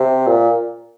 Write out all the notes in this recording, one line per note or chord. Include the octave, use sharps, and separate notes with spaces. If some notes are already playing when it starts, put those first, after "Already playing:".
Already playing: C3
A#2